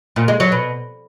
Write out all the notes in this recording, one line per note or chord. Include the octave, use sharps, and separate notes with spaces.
A#2
G#3
F#3
B2